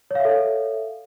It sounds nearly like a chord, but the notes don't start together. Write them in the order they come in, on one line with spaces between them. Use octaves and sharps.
C#5 F5 E5 A4